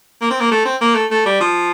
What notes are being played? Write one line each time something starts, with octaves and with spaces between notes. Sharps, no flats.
A#3
C4
A#3
A3
C4
A#3
A3
A3
G3
F3